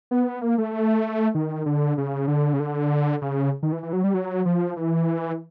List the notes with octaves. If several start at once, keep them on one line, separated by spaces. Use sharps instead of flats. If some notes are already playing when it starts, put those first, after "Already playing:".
B3
A#3
A3
D#3
D3
C#3
D3
C#3
D3
C#3
D#3
E3
E3
F#3
G3
F#3
F3
E3